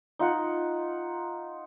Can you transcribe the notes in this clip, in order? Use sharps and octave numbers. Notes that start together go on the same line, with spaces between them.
D#4 F4 F#5